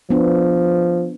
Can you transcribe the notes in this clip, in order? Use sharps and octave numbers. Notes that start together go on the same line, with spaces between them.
F3 B3 D4